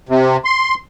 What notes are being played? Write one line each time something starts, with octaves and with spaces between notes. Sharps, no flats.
C3
C6